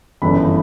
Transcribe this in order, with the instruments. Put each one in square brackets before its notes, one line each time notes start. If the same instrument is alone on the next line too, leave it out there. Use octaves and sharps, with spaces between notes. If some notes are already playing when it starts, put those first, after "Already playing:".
[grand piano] G1 F#2 C#3 E3 B5